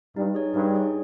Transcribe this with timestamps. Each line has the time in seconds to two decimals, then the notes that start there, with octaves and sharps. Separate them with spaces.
0.16 G2 D#4
0.35 G#4 C#5
0.54 G2 D#4
0.74 G#4 C#5